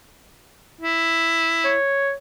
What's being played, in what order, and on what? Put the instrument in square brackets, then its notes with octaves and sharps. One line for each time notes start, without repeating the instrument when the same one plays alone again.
[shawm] E4
[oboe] C#5